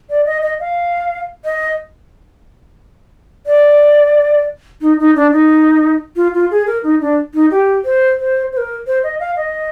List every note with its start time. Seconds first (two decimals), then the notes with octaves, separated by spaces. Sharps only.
0.10 D5
0.26 D#5
0.43 D#5
0.60 F5
1.45 D#5
3.46 D5
4.81 D#4
4.99 D#4
5.16 D4
5.32 D#4
6.16 F4
6.34 F4
6.51 G#4
6.67 A#4
6.84 D#4
7.01 D4
7.34 D#4
7.51 G4
7.85 C5
8.19 C5
8.52 C5
8.57 A#4
8.87 C5
9.03 D#5
9.20 F5
9.36 D#5